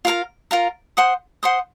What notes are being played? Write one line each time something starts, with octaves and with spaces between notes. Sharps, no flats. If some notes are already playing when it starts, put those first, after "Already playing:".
F4 A#4 F5 A#5
F4 A#4 F5 A#5
C5 F#5 C6 D#6
C5 F#5 C6 D#6